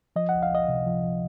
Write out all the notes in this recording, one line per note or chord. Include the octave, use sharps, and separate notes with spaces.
F3 D#5
F#5
C#2
F5
C#2 D#5
C3
F3
F3